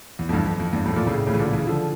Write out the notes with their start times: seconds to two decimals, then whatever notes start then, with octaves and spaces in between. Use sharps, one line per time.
0.19 E2
0.29 F2
0.33 E2 G2
0.46 F2
0.60 F2
0.73 E2 G2
0.86 F2 A2
0.96 A#2
1.07 A2 C#3
1.27 A2 C#3
1.34 E3
1.39 A#2 D3
1.53 C#3 E3
1.67 D3 F3